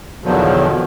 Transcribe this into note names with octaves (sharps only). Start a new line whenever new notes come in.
E2 B2 D3 D#3 F3 F#3